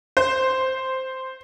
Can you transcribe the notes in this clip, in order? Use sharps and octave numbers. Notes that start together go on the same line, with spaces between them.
C5